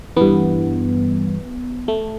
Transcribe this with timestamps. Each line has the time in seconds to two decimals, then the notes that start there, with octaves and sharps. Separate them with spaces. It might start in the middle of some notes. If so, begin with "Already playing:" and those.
0.16 G2 E3 B3
1.88 A3